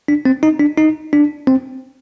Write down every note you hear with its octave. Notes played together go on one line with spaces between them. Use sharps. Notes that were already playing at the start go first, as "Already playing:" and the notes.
D4
C4
D#4
D4
D#4
D4
C4